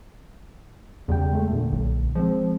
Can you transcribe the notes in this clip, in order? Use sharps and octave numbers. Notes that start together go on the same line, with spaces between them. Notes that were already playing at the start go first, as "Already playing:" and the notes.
E2 C#3 G3 G5
G#3 A3
A#2 D3
B1
F3 G#3 C4